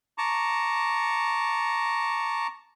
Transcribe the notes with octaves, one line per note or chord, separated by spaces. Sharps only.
A5 A#5 C#6 D6